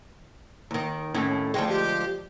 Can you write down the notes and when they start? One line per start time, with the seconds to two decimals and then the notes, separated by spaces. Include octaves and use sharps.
0.71 D#2 D#3
1.14 D#2 A2 C#4
1.54 D2 F3 G#3 G5
1.69 G4